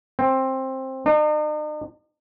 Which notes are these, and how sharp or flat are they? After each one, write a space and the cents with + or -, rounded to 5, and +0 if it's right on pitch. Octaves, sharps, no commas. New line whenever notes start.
C4 +15
D#4 -45